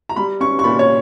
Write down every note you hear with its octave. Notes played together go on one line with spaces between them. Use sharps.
A#5
G3 B5
C#4 C#6
C#6
A#2 B5
C#5